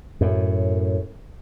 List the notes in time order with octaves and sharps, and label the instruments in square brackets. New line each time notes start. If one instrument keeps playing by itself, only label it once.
[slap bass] F#2 A2